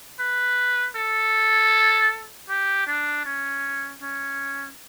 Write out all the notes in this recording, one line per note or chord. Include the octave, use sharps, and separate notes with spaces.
B4
A4
G4
D4
C#4
C#4